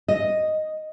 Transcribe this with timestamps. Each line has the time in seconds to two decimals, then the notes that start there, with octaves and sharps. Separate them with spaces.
0.08 D#5